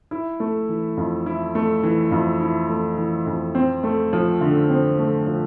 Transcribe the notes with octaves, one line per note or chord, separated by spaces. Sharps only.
E4
A3
E3
F2
E4
A3
E3
F2
E4
A3
E3
F2
C4
A3
F3
D3
C4
A3
F3